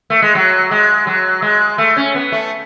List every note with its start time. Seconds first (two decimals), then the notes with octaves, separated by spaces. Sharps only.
0.10 A3
0.22 G#3
0.35 F#3
0.71 G#3
1.07 F#3
1.42 G#3
1.78 A3
1.97 C#4
2.15 B3
2.32 A3